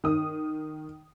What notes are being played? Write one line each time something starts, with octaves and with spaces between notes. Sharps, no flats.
D#3 D#6